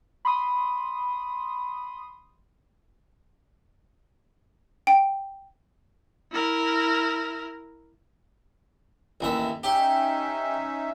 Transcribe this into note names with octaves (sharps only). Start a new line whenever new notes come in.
B5 C6 D#6
G5
E4 A#4
A1 D#2 E5
C#4 D#4 G4 E5